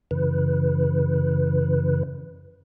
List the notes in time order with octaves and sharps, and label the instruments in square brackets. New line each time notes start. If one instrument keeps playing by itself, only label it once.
[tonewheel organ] F#2 C#3 E3 B4